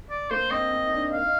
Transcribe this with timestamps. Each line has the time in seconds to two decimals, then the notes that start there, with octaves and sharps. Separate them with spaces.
0.10 D5
0.30 A#3 C5
0.51 C4 D#5
0.71 C4
0.86 D#4
0.93 D4
1.13 F5
1.25 D#4